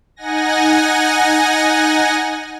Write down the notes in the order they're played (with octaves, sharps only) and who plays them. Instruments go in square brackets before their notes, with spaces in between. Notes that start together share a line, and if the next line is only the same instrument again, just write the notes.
[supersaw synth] D#4 F#5 G#5 A#6